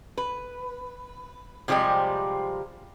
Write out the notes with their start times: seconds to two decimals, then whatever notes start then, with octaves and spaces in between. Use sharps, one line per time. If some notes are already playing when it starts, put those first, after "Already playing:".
0.17 B4
1.68 C3 F3 G3 G#3 G4